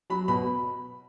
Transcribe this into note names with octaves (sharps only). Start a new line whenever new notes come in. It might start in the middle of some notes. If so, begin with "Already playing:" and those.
F#3 B5
B2 B5